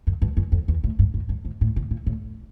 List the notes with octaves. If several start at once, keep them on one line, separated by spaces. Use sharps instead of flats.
F#2
G2
F#2
F2
E2
A2
G2
G#2
G2
G#2
A2
B2
A#2
A2